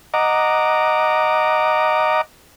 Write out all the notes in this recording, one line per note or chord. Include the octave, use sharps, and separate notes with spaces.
D#5 F#5 A#5 D6